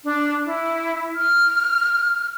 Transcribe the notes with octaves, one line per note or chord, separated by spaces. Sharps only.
D4
E4
F6